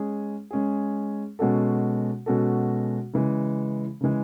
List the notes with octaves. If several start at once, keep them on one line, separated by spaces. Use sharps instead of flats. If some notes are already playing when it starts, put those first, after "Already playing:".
Already playing: G#3 C#4 G#4
G#3 C#4 G#4
B2 G#3 C#4 F#4 A4
B2 G#3 C#4 F#4 A4
C#3 E3 G#3
C#3 E3 G#3